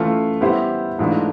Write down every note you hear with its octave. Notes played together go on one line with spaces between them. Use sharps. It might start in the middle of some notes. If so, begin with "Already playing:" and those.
Already playing: E3 A3 C#4 F4
G3 B3 E4 G4 C5
G#2 E3 A3 D4 F4